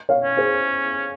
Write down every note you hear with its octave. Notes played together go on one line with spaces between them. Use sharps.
C#5 F5
C#4
G#4 C5